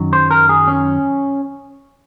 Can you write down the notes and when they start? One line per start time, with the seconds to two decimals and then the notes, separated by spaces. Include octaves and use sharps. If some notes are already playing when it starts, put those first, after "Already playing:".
Already playing: F#2 D#3 F#3
0.13 C5
0.31 A#4
0.49 G#4
0.68 C#4